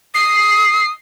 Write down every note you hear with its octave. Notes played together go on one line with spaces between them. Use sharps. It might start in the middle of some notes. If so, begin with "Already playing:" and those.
D#6 C7